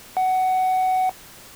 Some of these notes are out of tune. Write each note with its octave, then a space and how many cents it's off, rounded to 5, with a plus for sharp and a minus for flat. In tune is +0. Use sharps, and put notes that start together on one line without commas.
F#5 +15